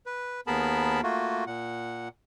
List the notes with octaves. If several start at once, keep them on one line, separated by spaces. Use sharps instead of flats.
B4
D#2 B3 G#4 A#4 A5 B5
A3 A#3 F4 F#4
A#2 F#5